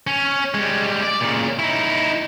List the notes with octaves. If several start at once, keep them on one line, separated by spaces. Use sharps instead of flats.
C#4
G3 G#3
D5
A#2 C#3
D#4 E4